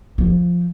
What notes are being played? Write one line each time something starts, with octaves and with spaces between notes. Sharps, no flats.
F3